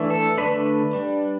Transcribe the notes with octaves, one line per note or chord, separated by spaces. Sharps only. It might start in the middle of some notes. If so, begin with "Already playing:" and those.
Already playing: E3 A3 D4
A4
D3 A3 D4 B4
G3 D4